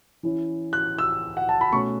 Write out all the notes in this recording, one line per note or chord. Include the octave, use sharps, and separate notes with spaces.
E3 C#4 E4
F#6
E6
F#5
A5
B5
B2 A3 C#4 C#6